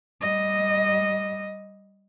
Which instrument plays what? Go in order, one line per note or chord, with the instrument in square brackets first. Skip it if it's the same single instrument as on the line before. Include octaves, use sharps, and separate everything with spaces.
[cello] G3 D#5